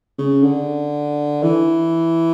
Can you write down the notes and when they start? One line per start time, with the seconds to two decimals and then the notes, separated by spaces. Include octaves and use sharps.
0.19 C#3
0.43 D3
1.43 E3